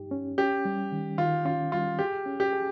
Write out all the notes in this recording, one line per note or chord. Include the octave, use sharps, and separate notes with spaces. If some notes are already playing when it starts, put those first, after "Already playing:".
Already playing: G2 D#4 G4
C#4
C#4 G4
G3
D#3
D#3 F4
C#4 F4
G3 F4
G4 G#4
C#4
G4
G#4